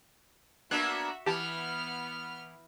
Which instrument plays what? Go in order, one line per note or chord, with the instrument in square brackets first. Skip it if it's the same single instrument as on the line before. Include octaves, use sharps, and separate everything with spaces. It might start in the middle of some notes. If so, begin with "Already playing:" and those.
[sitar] A#3 B3 D4 [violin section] F#4 E5 F#5 [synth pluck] F#6
[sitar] E3 [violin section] B3 F6 [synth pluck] G4 A5